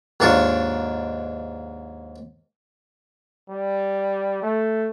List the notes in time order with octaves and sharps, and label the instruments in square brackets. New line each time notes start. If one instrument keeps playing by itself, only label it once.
[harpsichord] D#2 G#2 D4 F4 C#6
[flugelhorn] G3
A3